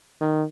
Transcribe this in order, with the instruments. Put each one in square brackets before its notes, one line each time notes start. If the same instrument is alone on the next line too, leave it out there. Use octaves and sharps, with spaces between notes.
[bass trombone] D#3